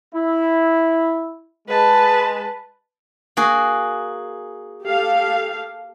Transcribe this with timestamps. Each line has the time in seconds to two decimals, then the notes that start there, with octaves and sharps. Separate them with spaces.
0.15 E4
1.68 G#3 B4 A5
3.37 A#3 F#4 G#4
4.84 G4 A4 F5